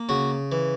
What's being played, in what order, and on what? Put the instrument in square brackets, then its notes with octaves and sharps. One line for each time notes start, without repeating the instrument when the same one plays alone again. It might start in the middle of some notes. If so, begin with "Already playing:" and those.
Already playing: [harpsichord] A#3
C#3 F#4
E3